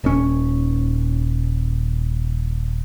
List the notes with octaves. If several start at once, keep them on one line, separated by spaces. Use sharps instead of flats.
D#1 C#4